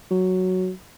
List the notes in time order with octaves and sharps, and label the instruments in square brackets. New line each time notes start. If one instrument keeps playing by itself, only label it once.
[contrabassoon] F#3